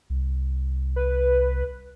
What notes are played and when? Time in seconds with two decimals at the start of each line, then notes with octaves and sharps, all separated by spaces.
0.10 C2
0.96 B4